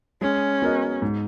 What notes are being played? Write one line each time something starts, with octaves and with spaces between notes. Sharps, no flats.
G#3 C#4
B3 F#4 A#4 D#5
G#2